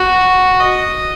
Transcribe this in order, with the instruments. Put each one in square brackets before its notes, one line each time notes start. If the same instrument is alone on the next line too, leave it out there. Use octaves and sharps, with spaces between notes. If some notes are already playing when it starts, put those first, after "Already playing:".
Already playing: [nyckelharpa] F#4
D#5